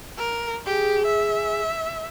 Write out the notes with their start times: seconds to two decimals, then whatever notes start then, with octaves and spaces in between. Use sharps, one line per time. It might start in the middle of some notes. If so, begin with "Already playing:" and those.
0.18 A#4
0.66 G4 G#4
1.06 E5